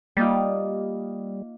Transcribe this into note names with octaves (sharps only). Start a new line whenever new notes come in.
G3 A#3 D#4 F4